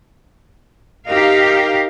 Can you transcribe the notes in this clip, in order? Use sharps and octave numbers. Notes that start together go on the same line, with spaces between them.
D#4 G4 A#4 F5